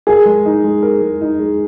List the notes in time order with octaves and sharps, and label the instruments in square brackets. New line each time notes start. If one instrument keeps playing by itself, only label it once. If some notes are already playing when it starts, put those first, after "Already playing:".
[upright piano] G#4 [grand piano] A#4
[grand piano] G#3
D#4
G#3
A#4
G#3
D#4
G#3